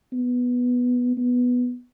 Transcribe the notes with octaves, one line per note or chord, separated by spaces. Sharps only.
B3
B3